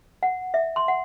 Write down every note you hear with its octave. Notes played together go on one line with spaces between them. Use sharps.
F#5
E5
C6
F#5